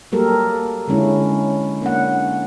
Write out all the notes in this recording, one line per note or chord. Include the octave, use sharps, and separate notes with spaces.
F#3 G3 A#3 G4 A4 A#4
D3 G#3 C#4 E4
A#3 C#4 D4 F#5